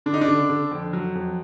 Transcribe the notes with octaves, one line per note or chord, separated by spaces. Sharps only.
D3 D4
D#4
D4
D3
D3
F2
F#3
F2